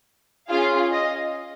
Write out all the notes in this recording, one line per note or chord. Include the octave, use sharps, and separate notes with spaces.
C#4 F4 G#4 F5
D#5